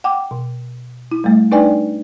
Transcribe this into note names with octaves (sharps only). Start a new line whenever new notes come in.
F#5 G5 D6
B2
E4
G3 A3
D4 D#4 B4 D5 G5 G#5